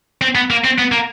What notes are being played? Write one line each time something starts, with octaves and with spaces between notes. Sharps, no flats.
C4
B3
A#3
C4
B3
A#3